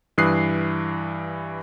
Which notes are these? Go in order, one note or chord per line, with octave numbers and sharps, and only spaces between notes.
G2 E3 D#6 F#6 C7